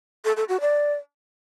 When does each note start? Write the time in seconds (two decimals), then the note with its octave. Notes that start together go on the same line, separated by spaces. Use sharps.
0.25 A4
0.37 A4
0.49 F#4
0.61 D5